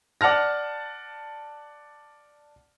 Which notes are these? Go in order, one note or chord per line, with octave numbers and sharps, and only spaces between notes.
D5 F#5 A5 F6 A#6